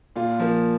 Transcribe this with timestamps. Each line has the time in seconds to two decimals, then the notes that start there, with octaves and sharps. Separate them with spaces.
0.16 A#2 F4
0.39 F3 A#3